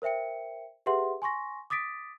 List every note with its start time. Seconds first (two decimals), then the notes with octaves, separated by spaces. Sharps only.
0.02 A#4 C5 E5 G5 C#7
0.86 G4 G#4 B4 E5 F#5 C6
1.22 G#5 C6 C#6 A#6
1.70 D6 D#6 A6 B6 D7